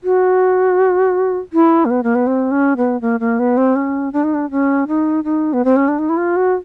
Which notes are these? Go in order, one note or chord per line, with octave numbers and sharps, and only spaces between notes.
F#4
E4
A#3
B3
A#3
B3
C4
C#4
B3
A#3
A#3
B3
C4
C#4
D4
D#4
D4
C#4
D#4
D#4
B3
C4
C#4
D4
D#4
E4
F4
F#4